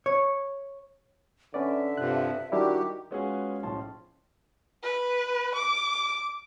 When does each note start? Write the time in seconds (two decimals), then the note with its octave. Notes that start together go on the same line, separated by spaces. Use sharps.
0.06 C#5
1.54 D3 C#4 B4 D5 E5
1.98 G2 C3 F3 F#6
2.52 D#3 G3 D4 E4 F#4 G4
3.11 G#3 B3 C#4 F4 F#4 G#4
3.63 B1 A2 F3 C#4 A5 C6
4.83 B4
5.55 D6